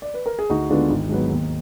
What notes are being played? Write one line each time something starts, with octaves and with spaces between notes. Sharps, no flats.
D5
B4
A#4
G#4
D2 D#4 F#4
D3 G#3 B3 D4 F4
G#1 D#4
G#2 F#3 B3
D#2